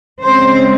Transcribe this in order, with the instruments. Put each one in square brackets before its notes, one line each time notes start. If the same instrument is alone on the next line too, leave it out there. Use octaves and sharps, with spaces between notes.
[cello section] C#3 G#3 C4 C5